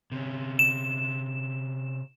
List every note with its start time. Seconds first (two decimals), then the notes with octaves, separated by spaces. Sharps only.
0.12 C3 C#4
0.59 E7